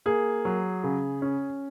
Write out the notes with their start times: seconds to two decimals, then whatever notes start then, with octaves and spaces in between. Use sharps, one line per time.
0.06 A#3 G#4
0.45 F#3
0.84 C#3
1.22 C#4